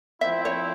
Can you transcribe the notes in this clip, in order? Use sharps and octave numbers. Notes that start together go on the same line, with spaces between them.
F3 C4 E4 E5
C#5